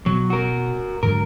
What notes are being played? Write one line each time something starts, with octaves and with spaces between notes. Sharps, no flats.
B2 F#3
F#4 A#4
G#2 D3 F#3 A#4